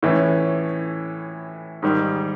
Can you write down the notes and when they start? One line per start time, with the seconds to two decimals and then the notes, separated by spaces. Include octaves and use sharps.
0.03 A2 E3 A3 C#4
1.82 G#2 D#3 G3